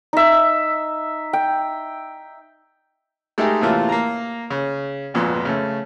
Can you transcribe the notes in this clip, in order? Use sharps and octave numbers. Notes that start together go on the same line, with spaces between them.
D#4 E5
G5
G#3 A3 D#4 G4 A#4
A2 C3 E3 A3 A#3 F4
A#3 A#5
C#3
G#1 F2 A#2 B3 C6
C#3 A3